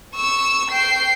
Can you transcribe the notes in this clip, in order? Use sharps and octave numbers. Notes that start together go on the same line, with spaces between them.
C#6 E6
G5 C7